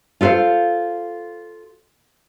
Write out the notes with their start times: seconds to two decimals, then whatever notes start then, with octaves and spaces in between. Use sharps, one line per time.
0.21 F4 A4 B4 C5 F5